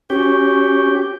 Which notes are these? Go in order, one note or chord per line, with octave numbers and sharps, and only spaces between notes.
C#4 F#4 G4